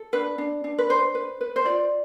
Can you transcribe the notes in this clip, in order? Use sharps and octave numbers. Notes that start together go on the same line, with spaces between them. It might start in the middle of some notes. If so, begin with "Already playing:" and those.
Already playing: A4
D4 B4
D4
D4
B4
B4 C5
B4
B4
C5
F4 D5